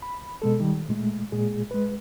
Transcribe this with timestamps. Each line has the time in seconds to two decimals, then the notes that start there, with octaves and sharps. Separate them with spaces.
0.02 B5
0.42 B2 G#3 A4
0.60 D#3 G3
0.89 A#2 G#3 A3
1.32 A#2 G#3 G#4
1.71 G#3 B4